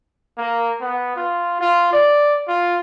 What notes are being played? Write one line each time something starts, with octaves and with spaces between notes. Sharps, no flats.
A#3
B3
F4
F4
D5
F4